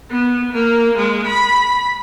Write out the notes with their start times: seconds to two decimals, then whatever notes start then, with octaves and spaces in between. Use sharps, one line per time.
0.11 B3
0.52 A#3
0.97 G#3
1.26 B5